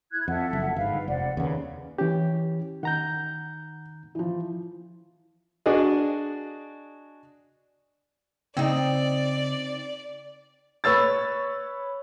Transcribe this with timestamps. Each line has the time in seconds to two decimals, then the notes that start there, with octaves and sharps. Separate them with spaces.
0.12 E4 F#6 G#6
0.28 F2 A4 E5 F#5
0.53 F#1
0.76 G1 G#2 B4 F5
1.08 F1 C5 D5 F#5
1.37 D#2 C#3 B4
1.98 E3 C#4 G4
2.83 D#3 F#5 A#5 G6
4.15 E3 F3
5.66 D4 F#4 G#4 D5 D#5
8.57 C#3 C4 D#4 D5
10.84 B4 C#5 E6 A6